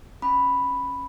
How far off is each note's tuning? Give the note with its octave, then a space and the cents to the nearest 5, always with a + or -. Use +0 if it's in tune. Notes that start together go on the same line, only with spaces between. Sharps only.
C#4 -20 B5 +0